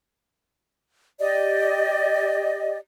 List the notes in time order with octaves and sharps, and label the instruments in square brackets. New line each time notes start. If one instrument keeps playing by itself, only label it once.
[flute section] G4 D5 D#5